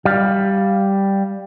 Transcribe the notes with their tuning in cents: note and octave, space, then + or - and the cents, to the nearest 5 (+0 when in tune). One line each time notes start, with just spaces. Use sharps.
G3 +0 F5 +0